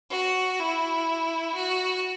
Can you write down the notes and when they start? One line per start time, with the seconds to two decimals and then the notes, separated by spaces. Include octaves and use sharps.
0.11 F#4
0.59 E4
1.55 F#4